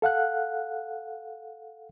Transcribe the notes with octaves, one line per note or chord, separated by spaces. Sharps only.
A4 F5 F#5 F#6